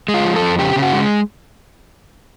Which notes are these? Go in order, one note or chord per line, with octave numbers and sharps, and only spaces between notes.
G#3
F4
F3
A4
F2
C#3 G4
C#3
F#4
G#3